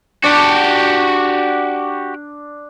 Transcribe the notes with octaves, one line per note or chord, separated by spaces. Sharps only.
D4 F#4 G4